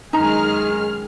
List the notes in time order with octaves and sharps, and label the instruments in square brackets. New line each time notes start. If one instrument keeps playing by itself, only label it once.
[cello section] F#2 D#3 G#3 [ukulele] D#4 A#5 [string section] G#4 F6